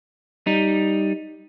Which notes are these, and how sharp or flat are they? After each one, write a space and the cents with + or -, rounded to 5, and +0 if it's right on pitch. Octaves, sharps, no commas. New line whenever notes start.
G3 -5 D#4 +0